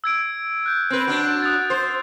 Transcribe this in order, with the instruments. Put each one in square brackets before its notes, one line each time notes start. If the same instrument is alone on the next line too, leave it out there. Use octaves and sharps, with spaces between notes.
[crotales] E6 G#6 D7
F#6 G6
[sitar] C4 B4
F#3 D4
[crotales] D#6 F#6 A6
[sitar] C5